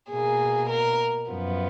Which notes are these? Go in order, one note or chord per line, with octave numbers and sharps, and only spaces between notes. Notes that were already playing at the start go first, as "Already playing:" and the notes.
B2 A#3 G#4
A#4
F#2 F3 B3